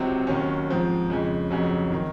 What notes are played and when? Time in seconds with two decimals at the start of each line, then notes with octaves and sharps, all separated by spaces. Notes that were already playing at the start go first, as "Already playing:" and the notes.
Already playing: C#2 C3 F#3 C4
0.27 D#2 D#3 F#3 C#4
0.68 G#2 F3 C4
1.10 F2 C#3 G#3
1.50 F1 F2 C#3 F#3
1.92 D#3